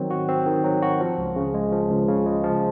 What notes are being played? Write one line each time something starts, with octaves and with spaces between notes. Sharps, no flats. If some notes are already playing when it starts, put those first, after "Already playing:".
Already playing: D#3 F#3 C4
F#4
C4
D#3
F#3
F#4
F3
C#2
C#3
G#3
F3
C#2
C#3
G#3
F3